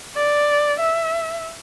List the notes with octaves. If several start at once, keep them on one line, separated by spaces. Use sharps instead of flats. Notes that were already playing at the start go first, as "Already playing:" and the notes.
D5
E5